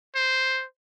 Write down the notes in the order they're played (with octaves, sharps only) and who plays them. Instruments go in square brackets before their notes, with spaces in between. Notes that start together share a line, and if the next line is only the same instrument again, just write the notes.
[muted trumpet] C5